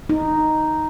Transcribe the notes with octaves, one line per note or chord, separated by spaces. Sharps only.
D#4